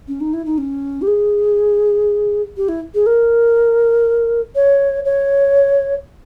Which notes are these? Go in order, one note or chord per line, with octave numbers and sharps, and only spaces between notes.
C#4
D#4
E4
D#4
C#4
G4
G#4
G4
E4
G#4
A#4
C#5
C#5